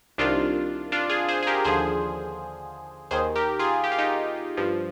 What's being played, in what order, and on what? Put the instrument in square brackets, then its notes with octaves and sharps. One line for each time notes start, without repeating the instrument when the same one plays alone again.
[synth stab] C2 C3 D#3 D4 F4
D4 F4
F4 G#4
G#4 C5
G#4
G4 A#4
D#2 D3 F3 G#4 C5
D#2 D#3 G#4 C5
G4 A#4
F4 G#4
G4
F4
D#4 G4
G2 F3